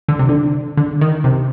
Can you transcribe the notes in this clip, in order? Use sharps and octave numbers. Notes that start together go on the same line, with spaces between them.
D3
C3
D3
D3
D#3
C3